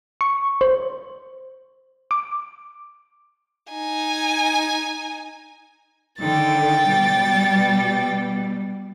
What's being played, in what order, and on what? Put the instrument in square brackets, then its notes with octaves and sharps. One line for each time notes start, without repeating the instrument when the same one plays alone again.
[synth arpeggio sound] C#6
C5
D6
[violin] D#4 G#5
[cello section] D3 D#3 [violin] G5 A6
[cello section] B2 G3